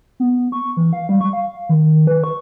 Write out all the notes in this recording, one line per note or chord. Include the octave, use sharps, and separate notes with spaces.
B3
C#6
E3
F5
G3
C#6
F5
D#3
B4
C#6